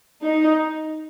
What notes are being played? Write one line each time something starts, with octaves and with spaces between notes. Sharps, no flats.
D#4